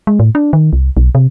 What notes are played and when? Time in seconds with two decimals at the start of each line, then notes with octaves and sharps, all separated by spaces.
0.07 G#3
0.20 A2
0.35 D4
0.53 D#3
0.73 C2
0.97 B1
1.15 C3